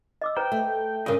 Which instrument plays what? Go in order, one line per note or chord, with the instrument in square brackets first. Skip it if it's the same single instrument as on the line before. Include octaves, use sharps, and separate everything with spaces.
[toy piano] D#5 D6 E6
[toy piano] B4 C5 A#5 [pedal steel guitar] G5
[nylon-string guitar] A3
[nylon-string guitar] G2 C#3 [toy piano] A#4 G#5 [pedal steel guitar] D#5